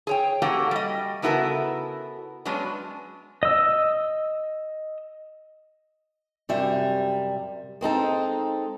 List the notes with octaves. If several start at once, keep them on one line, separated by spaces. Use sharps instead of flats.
G#4 C#5 G5
A#3 C#4 F#4 G4 A4
G3 D#5
C#3 B3 E4 F#4 A4 A#4
F#3 G#3 B3 C#4 D4
D#5 E6
F#2 C3 G3 E5
G#3 C4 D#4 A4